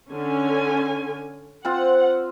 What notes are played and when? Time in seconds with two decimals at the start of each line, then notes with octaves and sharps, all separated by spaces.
0.11 D3 C#4 G#5
1.65 C4 F4 C5 F#5